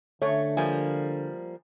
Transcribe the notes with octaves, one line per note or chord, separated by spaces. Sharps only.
D3 A3 C#5
F3 G3 A#3 G#5